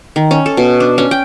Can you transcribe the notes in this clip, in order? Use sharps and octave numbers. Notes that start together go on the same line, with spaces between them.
D#3
C#4
A4
B2
D4
C#4
G5